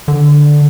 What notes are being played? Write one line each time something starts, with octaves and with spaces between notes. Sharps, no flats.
D3